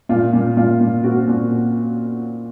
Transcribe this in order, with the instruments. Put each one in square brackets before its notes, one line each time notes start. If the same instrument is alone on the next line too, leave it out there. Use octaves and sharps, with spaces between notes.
[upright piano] A#2 F4
A#2
A#2 F4
A#2
C4 F#4
A#2